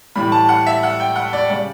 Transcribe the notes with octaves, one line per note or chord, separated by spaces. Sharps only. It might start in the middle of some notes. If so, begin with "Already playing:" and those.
A2 E3 G3 B5
A5
F#5
E5
F#5
G5
F#5
D5
C#3 G3 D5